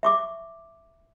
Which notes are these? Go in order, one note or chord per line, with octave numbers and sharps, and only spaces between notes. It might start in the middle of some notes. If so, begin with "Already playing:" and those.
E5 C#6 D6